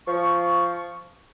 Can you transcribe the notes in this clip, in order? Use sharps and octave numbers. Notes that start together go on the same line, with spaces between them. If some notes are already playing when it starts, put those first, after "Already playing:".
F3 C#6